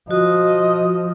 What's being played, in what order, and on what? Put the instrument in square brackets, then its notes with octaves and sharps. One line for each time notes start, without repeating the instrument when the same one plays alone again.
[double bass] F3 [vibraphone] F#4 [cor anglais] D#5